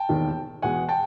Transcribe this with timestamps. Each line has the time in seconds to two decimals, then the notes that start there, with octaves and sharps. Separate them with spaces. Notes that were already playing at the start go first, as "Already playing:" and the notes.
Already playing: G5 A5
0.09 E1 D#2 D#3
0.62 E2 B2 G#3 F#5 G#5
0.89 G5 A5